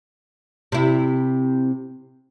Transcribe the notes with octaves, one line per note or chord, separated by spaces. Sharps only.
C3 E4